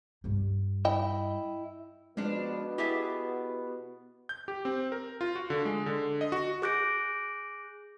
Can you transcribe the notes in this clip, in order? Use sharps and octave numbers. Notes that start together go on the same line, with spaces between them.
G2 G3
E4 D#5 G5
B2 F3 G#3 B3 D4
E4 G4 G#4 E5 F#5 A6
G6
G4
C4
A#4
F4
F#4
D3
G#3
D3
D#5
F#4
G#4 D6 F#6 G6 A#6 D7